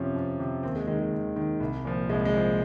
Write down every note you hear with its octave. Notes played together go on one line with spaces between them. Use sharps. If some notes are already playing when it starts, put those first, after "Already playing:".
Already playing: F2 C3 F3 C#4
F2
C3 F3
D#2 C4
G#3
D#3 G#3
G#3
D#2
D#3
C2
A#2 F3
C2 G#3
G#3
A#2 F3